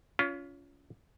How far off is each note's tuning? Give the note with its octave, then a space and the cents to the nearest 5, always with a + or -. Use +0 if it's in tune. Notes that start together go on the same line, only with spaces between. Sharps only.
C#4 +30 F4 +0